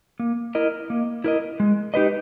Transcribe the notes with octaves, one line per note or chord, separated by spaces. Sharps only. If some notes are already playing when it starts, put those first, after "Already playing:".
A#3
E4 A#4 D#5
A#3
E4 A#4 D#5
G#3
D#4 G4 B4 D#5